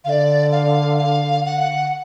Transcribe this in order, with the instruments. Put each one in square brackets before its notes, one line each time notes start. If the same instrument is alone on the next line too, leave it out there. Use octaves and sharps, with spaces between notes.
[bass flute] D3 [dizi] D5 F5
[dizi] F5
F5
F#5